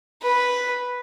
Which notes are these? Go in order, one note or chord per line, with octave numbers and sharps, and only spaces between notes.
B4